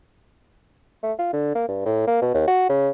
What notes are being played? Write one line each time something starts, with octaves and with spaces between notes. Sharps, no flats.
A3
F4
D3
A#3
G2
A2
A#3
B2
D#2
F#4
C#3